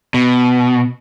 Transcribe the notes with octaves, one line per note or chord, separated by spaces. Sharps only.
B2